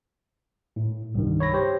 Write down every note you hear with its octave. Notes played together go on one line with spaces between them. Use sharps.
A2
C2 G2 D#3
C#5 B5 A#6
G4 C5 C#5